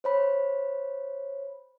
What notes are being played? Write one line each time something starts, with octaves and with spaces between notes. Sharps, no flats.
C5 C#5 B5